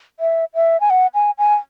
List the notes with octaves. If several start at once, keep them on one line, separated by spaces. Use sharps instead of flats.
E5
E5
G#5
F#5
G#5
G#5